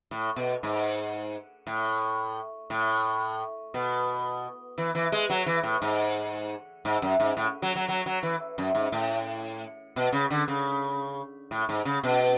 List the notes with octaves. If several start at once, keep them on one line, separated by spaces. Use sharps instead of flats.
A2
B2
G#2
A2
A2
B2
E3
E3
G#3
F#3
E3
A2
G#2
G#2
F#2
G#2
A2
F#3
F#3
F#3
F#3
E3
F#2
G#2
A2
B2
C#3
D3
C#3
A2
G#2
C#3
B2